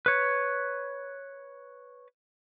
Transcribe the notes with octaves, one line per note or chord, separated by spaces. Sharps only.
B4 C#5